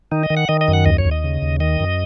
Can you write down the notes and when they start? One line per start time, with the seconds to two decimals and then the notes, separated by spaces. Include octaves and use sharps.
0.12 D#3 D#4
0.23 D#5
0.30 D#3
0.37 F#5
0.49 D#3 D#5
0.61 D#5
0.68 F#2
0.73 F#5
0.86 D#2 D#5
0.98 C#5
1.05 D#2
1.11 D#5
1.24 C#3
1.42 D#2
1.60 D#3 D#5
1.80 F#2